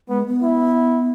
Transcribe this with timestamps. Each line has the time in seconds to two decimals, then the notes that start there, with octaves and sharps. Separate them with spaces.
0.09 G#3 B3
0.26 B3
0.42 E4